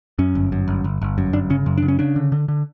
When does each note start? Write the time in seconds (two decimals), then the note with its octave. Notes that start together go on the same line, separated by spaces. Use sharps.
0.19 F#2 C#4
0.35 G1
0.52 F#2
0.68 G1
0.84 G1
1.02 G1
1.18 F#2
1.33 G1 D4
1.50 C#3 C#4
1.66 F#2
1.78 C#3 D4
1.88 C#4
1.99 C#3 D4
2.16 D3
2.32 D3
2.48 D3